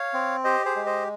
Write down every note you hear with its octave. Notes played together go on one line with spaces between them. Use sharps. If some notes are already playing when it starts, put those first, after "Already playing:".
Already playing: C#5 F5
C4
G4 C5 D#5
G#4 C5
G#3
C5 D#5